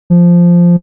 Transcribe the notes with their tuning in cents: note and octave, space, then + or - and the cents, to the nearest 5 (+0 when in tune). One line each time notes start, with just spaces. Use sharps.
F3 -5